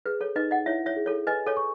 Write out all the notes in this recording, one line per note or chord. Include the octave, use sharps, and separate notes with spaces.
G#4 B4
A4 C#5
D#4 B4 D#5
D#5 F#5
E4 C#5 E5
C#5 E5
G#4
A4 C#5
B4 D#5 G#5
A4 C#5
C#6